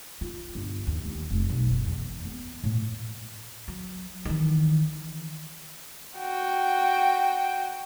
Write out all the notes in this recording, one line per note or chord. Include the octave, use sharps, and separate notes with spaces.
F4
G1
D#2
D#2
F1
B1
F#1
E2
B3
A2
F#3
D#3 E3
F#4 G5